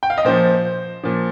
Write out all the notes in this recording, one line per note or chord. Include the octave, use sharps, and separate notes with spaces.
G5
F5
D#5
A#2 F3 C5
A#2 F3